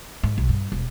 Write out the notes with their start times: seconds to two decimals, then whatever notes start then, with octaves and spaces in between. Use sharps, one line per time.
0.23 G#2
0.38 B1
0.49 G2
0.72 E1